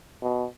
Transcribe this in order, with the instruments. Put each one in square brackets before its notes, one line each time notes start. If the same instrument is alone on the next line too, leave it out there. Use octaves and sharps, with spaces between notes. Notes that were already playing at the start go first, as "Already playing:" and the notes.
[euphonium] B2